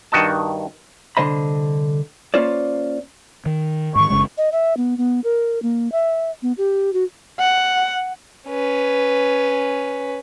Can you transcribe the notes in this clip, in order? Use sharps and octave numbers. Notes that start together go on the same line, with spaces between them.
G2 D#3 F#4 D#5 A5
C2 D3 E3 C5 D#5 B5
A#3 C#4 F4 C5 D5
D#3
G#2 D#3 C#6
F#1 C#3 G#3
D#5
E5
B3
B3
A#4
A#3
E5
B3
G4
F#4
F#5
C#4 B4